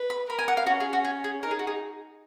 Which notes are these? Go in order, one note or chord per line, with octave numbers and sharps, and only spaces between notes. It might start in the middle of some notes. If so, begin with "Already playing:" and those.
Already playing: B4
B5
A#4 B5
G#5
F#5
F5
C#4 F#4
G#4
F#4
G#4
G#4
D#4 A#4
G#4
F#4
G#4